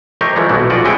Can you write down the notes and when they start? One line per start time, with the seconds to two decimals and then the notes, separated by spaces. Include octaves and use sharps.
0.21 A3 G4 A#4 C5 C#5 D#5
0.36 E3 F3 G3 G#3
0.49 B1 B2 A3 E4 F#4 F#5
0.70 F3 C#4 F4 F#4 D5 D#5
0.85 G#3 B3 C#4 E4 G#4 G5